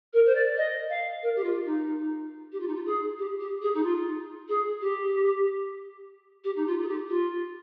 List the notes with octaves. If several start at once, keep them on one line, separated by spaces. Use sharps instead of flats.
A#4
C5
D5
D#5
F5
A#4
G4
F4
D#4
G4
F4
D#4
F4
G#4
G4
G4
G#4
D#4
F4
G#4
G4
G4
D#4
F4
G#4
G4
F4